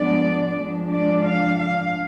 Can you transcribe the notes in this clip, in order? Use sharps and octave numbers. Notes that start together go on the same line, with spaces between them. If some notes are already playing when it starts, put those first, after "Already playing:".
Already playing: F3 G#3 B3 D4 D5
F3 G#3 D4
D5
F5
F5